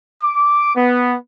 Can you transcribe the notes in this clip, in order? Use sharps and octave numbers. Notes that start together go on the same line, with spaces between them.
D6
B3